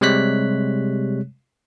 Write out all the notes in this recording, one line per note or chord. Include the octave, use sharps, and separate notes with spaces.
C3 G3 G#3 C#5 F#6 B6